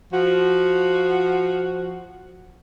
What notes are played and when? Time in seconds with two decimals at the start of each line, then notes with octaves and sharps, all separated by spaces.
0.13 F3 F#4